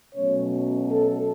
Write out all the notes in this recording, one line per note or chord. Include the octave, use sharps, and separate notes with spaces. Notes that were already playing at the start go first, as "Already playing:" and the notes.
B2 F#3 A3 C#4 C#5
A4